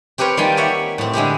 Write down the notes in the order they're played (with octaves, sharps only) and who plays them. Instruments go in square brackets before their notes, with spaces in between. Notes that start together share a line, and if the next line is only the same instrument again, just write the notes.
[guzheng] C4 G4 A#4 B4 C#5
D#3 G3 A#3 F4 G5 G#5
G4 C#5 E5 F#5
A2 C4
D3 G#3 E4 G4